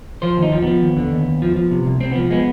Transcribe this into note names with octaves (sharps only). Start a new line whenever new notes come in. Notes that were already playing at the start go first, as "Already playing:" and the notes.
F3 C5
D#2
D#4
F3
F3 B3
D#2
D3
D#2
D#2
F3
F3
C3
C2
C2 C4
F3 B3
G#3 B3